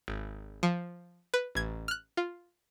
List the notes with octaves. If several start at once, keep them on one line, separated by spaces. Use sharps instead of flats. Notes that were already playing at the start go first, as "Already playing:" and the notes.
G#1
F3
B4
A1 G#6
F6 F#6
F4